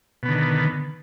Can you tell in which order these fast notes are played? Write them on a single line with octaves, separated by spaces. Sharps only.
B2 B3 D3 D#3